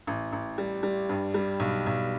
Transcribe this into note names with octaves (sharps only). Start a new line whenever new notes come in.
A1
A1
G3
G3
G2
G3
B1
B1